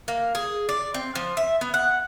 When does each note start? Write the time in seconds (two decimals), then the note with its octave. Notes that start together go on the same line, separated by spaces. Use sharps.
0.08 A#3
0.35 G#4
0.69 D5
0.94 C4
1.15 F3
1.37 E5
1.61 B3
1.74 F#5